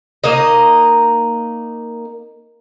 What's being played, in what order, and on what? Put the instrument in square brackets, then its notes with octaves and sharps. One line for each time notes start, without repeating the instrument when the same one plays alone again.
[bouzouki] A#3 D#4 D#5